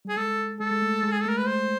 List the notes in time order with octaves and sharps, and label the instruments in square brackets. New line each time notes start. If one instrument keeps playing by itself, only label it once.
[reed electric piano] G3 [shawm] G#4
[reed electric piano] G#3 [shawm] A4
[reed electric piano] G#3 [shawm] A4
[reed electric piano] G#3
A3
G#3
[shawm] G#4
A4
[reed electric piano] A3 [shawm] A#4
[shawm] B4
C5